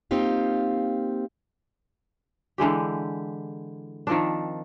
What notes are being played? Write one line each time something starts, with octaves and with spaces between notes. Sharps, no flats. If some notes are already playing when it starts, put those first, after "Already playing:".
A#3 C4 D#4 F4 G4 F5
D3 E3 G#3 G4
D#3 F3 C4 D4